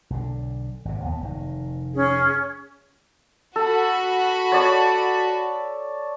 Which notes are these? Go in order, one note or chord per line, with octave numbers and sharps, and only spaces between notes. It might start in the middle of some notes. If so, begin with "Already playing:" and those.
B1 D3
G#1 C3
D#2 B3
F1 D#3
C#4 G#4
F#4 A4 B5
C#5 D5 A5